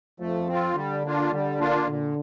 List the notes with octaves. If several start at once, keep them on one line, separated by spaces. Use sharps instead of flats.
F2 F3 A3
C4 F4
D3 G3
A#3 D4 F4
D3 G3
A#3 D4 F4
A#2 D3